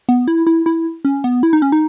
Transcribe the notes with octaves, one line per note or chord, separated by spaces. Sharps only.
B3
E4
E4
E4
C#4
B3
E4
D#4
C#4
D#4